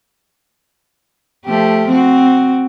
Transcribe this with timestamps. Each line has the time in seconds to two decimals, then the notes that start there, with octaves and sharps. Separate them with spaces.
1.45 F3 A3 G4
1.88 C4 F#4